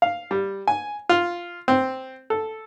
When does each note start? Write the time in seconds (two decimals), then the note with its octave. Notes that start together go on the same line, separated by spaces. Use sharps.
0.02 F5
0.31 G3
0.67 G#5
1.09 F4
1.68 C4
2.30 A4